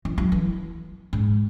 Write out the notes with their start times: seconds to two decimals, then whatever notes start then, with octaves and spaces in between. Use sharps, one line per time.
0.05 E3
0.18 F#3
0.32 E3
1.13 G#2